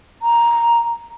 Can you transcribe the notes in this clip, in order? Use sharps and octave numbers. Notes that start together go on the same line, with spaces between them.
A#5